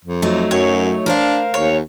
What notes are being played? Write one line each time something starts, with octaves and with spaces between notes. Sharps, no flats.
F2
F#3 A3 D#4
F#2 C#5
D4 A#4 C5 F5
D#2 C#5